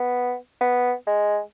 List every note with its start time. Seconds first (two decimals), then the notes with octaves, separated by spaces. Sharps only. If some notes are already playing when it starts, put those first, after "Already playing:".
Already playing: B3
0.61 B3
1.07 G#3